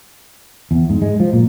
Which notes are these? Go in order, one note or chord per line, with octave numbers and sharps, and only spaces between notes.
E2
G#2
G#3
F3
A#2